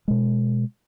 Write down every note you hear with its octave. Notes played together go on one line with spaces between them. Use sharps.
B2 G#3